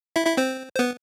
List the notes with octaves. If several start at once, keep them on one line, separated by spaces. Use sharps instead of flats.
E4 E5
E4 E5
C4 C5
C5
B3 B4